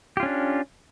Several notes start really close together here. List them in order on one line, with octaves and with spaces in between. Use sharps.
G4 F4 C#4 D4